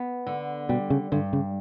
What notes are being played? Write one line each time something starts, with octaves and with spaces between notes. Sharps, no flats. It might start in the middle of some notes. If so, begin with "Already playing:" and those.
Already playing: B3
D3
B2 G3
C#3
G2 D3
C#3